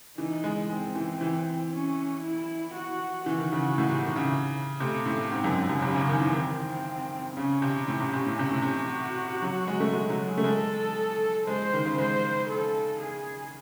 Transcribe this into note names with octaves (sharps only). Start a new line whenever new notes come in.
E3 D#4
G#3
G#3 C4
E3
E3
C#4
E4
F#4
E3 F#4
D#3
C#3
A2
C3
D#3
C#3
C3 A3
A2
G#2 C4
F#2
G#2
F#2
C#3
C3 C#4
C#3
D#3
E3
D#3 C4
C#3 C#4
C3
A2 C#4
C3
C3
A2
C3
A2
C3
F#4
F#3
G#3
A3
G#3
F#3
G#3
A3
G#3 A4
G#3 C5
D#3
C#3
G#3 C5
A4
G#4